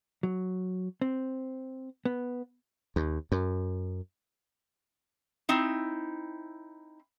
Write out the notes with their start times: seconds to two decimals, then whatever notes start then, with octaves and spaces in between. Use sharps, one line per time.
0.23 F#3
1.01 C4
2.05 B3
2.96 D#2
3.32 F#2
5.49 C4 D#4 E4